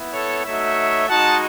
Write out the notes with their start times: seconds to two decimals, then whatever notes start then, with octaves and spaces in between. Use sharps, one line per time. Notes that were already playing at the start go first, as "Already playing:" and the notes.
Already playing: B3 E4
0.13 A4 C#5
0.45 A3 D#4 F#4 C#5 E5
1.08 G#3 D#4 F#4 F#5 A5